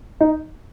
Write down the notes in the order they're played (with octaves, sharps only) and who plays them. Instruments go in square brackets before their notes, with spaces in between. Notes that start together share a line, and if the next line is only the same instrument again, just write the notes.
[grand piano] D#4